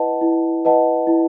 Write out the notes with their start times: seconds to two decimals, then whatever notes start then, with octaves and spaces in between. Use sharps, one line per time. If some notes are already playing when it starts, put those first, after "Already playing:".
Already playing: E4 B4 D#5 F#5 A5
0.21 E4
0.65 B4 D#5 F#5 A5
1.07 E4